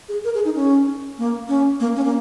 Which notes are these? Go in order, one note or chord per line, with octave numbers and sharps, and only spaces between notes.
G#4
A#4
G#4
D#4
C#4
A#3
C#4
A#3
C#4
A#3